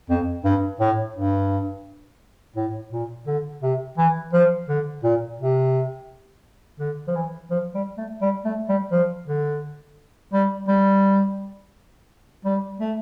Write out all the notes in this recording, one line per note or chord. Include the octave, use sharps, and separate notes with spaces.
F2
G2
A2
G2
A2
A#2
D3
C3
E3
F3
D3
A#2
C3
D3
F3
E3
F3
G3
A3
G3
A3
G3
F3
D3
G3
G3
G3
A3